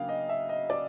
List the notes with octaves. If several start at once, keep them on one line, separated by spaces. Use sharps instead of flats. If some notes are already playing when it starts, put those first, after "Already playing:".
Already playing: C#3 F#3 A#3 D4 F5 G5
D#5
E5
D#5
D5